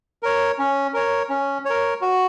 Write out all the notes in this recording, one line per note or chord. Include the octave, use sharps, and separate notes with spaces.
A#4 C#5
C#4
A#4 C#5
C#4
A#4 C#5
F#4